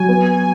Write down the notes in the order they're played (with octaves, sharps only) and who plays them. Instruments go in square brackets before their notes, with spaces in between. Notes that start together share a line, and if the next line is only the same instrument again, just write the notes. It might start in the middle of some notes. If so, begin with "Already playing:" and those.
Already playing: [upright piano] F#3 [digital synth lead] G#5
[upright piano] B3